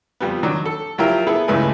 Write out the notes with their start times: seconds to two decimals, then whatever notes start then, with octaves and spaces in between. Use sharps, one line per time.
0.20 F2 G3 B3
0.43 D#3 F#3 D4
0.65 A4
0.98 F3 F#3 E4 F4 G4 A#4
1.27 B3 E4 G#4 A4 B4
1.48 C#2 G2 E3 A3 B4 G#5